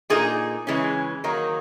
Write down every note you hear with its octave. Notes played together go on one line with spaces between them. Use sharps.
A#2 A#3 D#4 G#4
C#3 E3 G#3 C#4
D#3 F#3 A#3 D#4